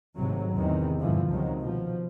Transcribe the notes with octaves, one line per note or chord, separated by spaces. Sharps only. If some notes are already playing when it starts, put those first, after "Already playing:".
G#1 A2 C3 F#3
E2 C3 D#3
G2 B2 D3 E3 F3
C#2 C3 D#3 F#3
B2 F3